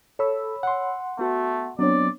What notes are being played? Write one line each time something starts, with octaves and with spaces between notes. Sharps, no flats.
A4 C#5 B5 E6
F#5 C6
A3 B3 F#4
F#3 B3 C4 D4 C#5 D5